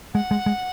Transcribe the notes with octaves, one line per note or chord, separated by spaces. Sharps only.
G#3 F#5
G#3
G#3